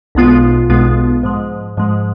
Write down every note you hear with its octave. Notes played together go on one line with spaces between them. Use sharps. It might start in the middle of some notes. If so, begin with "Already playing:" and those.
B1 B2 G#3 B3 F4
B1 B2 G#3 B3 F4
G#2 F3 G#3
G#2 F3 G#3